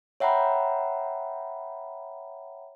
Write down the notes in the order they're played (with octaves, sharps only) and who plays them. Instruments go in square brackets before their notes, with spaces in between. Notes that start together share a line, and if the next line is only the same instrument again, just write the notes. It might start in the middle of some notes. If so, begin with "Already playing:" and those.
[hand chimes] C#5 E5 F#5 G5 A#5 B5